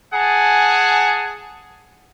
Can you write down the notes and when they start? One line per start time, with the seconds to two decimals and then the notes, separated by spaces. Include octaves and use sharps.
0.14 G#4 F#5 G#5 A5